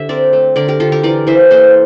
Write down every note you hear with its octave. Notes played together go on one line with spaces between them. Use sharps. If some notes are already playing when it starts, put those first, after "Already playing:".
Already playing: D3 G4 E5
C4 A#4 D5
A3
D3 A#4 D5
G4 A#4
D3 F4 A4
G4 A#4
E3 A#4 D5
E3 C5 E5
A#3 A4 C5